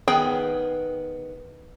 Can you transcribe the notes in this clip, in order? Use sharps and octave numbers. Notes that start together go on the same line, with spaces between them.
D#3 B3 G#4 G5